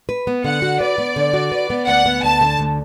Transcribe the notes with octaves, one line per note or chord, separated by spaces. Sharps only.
B4
B3
D3 F#5
F#4
B4 D5
B3
D3
F#4
B4
B3
D2 F#5
B3
D2 A5
D3
D2